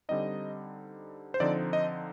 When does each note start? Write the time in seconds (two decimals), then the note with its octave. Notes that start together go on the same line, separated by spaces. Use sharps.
0.09 D3 G3 C4 D#4 D#5
1.34 C5
1.40 D3 F3 C4 D#4 D5
1.73 D#5